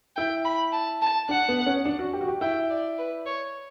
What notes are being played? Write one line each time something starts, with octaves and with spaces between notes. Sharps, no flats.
E4 G5
B5
A5
A5
D4 F#5
B3
C#4
D4
F#4
G4
F#4
G4
E4 G5
D5
B4
C#5